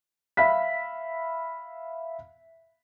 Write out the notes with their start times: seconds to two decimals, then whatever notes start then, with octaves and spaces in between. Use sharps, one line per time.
0.37 E5 F5 B5 B6